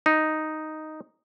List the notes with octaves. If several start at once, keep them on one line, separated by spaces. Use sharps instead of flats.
D#4